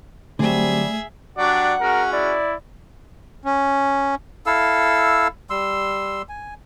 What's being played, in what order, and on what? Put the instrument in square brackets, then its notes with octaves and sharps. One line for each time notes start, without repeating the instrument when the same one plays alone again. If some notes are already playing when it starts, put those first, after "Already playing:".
[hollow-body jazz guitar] D3 F#3 [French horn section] G3 C4 [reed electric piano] A3 [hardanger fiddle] G#4 E5
[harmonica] F#3 D4 G4 [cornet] D5 [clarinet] F#5
[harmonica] G#3 C#4 F#4 [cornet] A#4
[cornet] E4 [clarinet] D5
[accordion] C#4
[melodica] E4 A4 F5 E6
G3 C6 E6
G#5